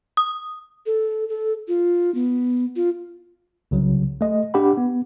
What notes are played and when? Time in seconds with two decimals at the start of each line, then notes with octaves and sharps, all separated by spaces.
0.17 D#6
0.86 A4
1.29 A4
1.68 F4
2.15 B3
2.76 F4
3.71 C2 C#3 F#3
4.21 A3 D#5
4.54 D4 G4 F#5 B5
4.77 B3